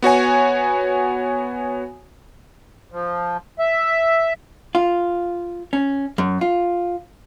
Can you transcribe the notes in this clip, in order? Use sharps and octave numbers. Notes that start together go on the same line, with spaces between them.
B3 F#4 C#5 G#5
F3
E5
F4
C#4
F#2
F4